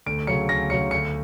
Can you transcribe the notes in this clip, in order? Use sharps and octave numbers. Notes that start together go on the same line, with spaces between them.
D2 D7
C#3 F#3 C#7
D2 A#6
C#3 F#3 C#7
D2 C#7